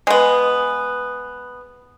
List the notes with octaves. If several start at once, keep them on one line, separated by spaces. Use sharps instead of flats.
G#3 B3